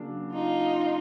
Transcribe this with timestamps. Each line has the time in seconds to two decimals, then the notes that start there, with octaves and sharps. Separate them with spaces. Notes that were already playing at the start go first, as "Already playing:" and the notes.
Already playing: C#3 F#3 A#3 D4
0.32 D#4 F4